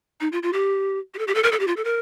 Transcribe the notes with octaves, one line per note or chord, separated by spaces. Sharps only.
D#4
F4
F4
G4
G4
A4
G4
A4
A#4
A4
G4
F4
A4
A#4